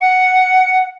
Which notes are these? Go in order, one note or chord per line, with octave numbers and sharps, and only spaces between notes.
F#5 C#7